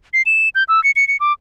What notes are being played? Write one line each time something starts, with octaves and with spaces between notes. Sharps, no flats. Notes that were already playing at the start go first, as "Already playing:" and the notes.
C7
E7
G6
E6
C#7
C#7
C#7
D6